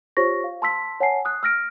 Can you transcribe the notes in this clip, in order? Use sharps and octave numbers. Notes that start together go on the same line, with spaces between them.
F4 G4 C5 C#5 C#6 A#6
F5
A5 C6 E6 B6
C#5 F#5 G#5 A5 C7
D#6 F#6
E6 F6 A#6 D7